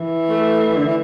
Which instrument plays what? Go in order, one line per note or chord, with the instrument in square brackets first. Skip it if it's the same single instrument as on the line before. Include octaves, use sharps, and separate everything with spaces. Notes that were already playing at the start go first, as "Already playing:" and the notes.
Already playing: [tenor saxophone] E3
[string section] A3
[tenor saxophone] D3
E3